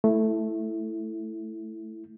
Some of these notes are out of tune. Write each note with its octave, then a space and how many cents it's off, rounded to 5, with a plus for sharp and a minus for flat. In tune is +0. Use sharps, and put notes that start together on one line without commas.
A3 +0 E4 +0